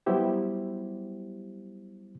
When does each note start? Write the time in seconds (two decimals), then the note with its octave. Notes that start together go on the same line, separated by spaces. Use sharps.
0.06 F#3 G3 B3 E4 G4 C5